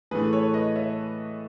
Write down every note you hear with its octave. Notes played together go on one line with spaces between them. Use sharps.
A2 E3 A3 G#4 B4
A4 C#5
B4 D#5
C#5 E5